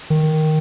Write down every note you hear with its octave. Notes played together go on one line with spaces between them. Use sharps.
D#3